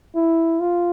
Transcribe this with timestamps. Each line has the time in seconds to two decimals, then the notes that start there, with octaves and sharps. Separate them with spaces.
0.16 E4
0.60 F4